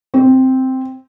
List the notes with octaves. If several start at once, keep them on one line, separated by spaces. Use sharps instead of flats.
C4